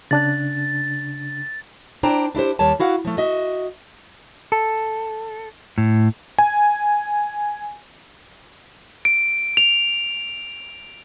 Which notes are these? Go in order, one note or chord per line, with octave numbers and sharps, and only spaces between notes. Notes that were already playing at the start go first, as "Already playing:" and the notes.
C#3 D4 F#6 A6
D4 E4 C5 D5 G5 A#5
D4 E4 G4 C5
D#2 G3 C#5 A5
E4 F#4 F5 F#5
F3 A3
F#4 D#5 E5
A4
A2
G#5
D7
F7